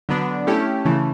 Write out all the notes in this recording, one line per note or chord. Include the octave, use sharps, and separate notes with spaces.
D3 F#3 B3 D4
A3 C#4 E4 G4
C#3 E3 A3